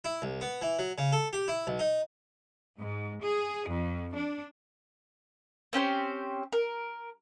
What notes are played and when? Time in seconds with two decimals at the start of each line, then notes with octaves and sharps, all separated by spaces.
0.05 E4
0.22 C2
0.41 B3
0.61 E3
0.79 F#3
0.98 C#3
1.13 A4
1.33 G4
1.48 E4
1.67 B1
1.79 D#4
2.78 G#2
3.24 G#4
3.68 F2
4.14 D4
5.73 C4 C#4 G4 C5
6.52 A#4